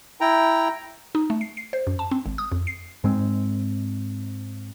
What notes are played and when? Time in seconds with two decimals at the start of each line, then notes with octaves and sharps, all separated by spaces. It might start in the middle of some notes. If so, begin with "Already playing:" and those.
0.21 E4 G5 A#5
1.15 D#4
1.30 A3
1.41 C7
1.57 C7
1.73 C5
1.87 F#2
1.99 A5
2.11 C4
2.26 G#1
2.38 D#6
2.52 F2
2.67 C7
3.04 G#2 G#3 C4